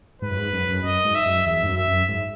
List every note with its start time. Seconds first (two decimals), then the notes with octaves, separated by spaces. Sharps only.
0.22 G#2 B4
0.31 F#2
0.38 G#2
0.53 F#2
0.69 F#2
0.84 F#2 D#5
1.05 G#2
1.15 E5
1.26 F#2
1.47 E2 E5
1.63 G#2
1.67 F#2
1.78 E5
1.88 F#2
2.09 G#2